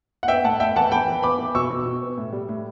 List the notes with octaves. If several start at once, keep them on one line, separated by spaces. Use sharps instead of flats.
F#5
B3 E5 G5
A2 F#5 A5
A2 E5 G5
E3 F#5 A5
E3 G5 B5
E3
B3 B5 D6
E3
B2 C#6 E6
B2
B2
B3
A2
G3
A2